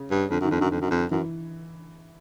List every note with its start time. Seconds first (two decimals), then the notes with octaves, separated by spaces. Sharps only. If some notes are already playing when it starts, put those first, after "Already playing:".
Already playing: C#3
0.11 G2
0.31 F2 D3
0.41 F#2 D#3
0.51 F2
0.58 F#2 D3
0.71 F2
0.81 F#2
0.91 F2
1.11 F#2 E3